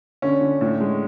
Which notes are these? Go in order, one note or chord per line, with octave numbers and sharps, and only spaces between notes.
D3 C#4
D3
A2
G#3